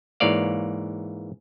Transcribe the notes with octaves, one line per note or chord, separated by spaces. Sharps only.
G#2 E3 A#3 C#5 D5 F5